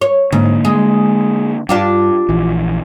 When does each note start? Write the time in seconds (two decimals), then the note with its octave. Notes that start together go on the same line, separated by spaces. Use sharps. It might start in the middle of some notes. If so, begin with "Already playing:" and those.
0.01 C#5
0.32 G#2 D3 A#3
0.65 G#3
1.69 G2 D4 F4 G4
2.29 A#1 E3